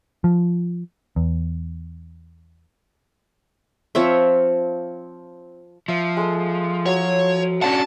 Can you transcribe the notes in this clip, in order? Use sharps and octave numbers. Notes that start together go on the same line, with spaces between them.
F3
E2
F3 C4 C#5 E5
F3 E5
G#3 A4 A5
F#3 C#5
C#4 D4 F#5 A5